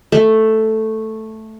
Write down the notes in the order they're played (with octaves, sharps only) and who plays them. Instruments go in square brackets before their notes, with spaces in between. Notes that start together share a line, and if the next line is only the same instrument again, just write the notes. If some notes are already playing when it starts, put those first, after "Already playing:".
[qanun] A3